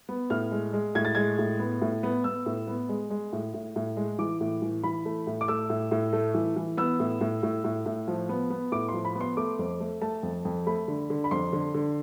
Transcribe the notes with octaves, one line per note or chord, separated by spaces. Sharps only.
B3
A2 F6
G#3
G#3
A2 G#6
A6
G#3 G#6
A2
B3
A2
B3
B3 E6
A2
B3
G#3
G#3
A2
A2
A2
G#3
E3 D6
A2
E3
E3 B5
A3
A2
D6
A3 E6
A2
A2
A3
E3
E3
B3 E6
A2
A2
A2
A2
A2
F3
B3
B3
A2 D6
F3 C6
B5
B3 C6
A3 D6
F2
A3
A3 A5
F2
F2
A3 B5
D3
D3
B5
F2 C6
D3
D3